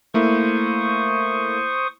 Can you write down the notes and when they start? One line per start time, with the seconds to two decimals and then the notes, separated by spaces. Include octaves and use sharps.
0.14 A3 A#3 E4 C5 C#6 D#6